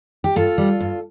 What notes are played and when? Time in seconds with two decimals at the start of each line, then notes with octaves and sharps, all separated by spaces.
0.24 G4
0.36 G2 F4 A4
0.58 G3
0.80 G2